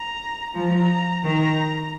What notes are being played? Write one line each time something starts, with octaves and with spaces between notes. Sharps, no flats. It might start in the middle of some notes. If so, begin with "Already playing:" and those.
Already playing: A#5
F3 A#5
D#3 A#5